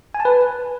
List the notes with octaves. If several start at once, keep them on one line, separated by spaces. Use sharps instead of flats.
G#5
A5
B4